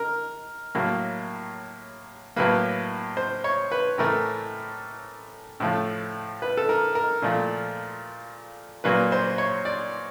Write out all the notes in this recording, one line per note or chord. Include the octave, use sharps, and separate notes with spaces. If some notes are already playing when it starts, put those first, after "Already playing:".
Already playing: A#4
A2 F#3 A#3
A2 F#3 A#3 B4
C5
C#5
B4
A2 E3 A3 A#4
A2 F3 A3
B4
A4
A#4
A#4
A#2 F3 A3
A#2 F#3 A#3 B4
C5
C#5
D5